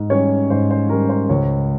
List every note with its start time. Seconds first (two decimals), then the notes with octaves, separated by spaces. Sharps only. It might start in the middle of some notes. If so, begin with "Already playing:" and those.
Already playing: G#2
0.10 G3 C#4 C#5
0.50 G#2 C5
0.71 C5
0.89 G3 C#4 A#4
1.09 C5
1.29 C#2 C#5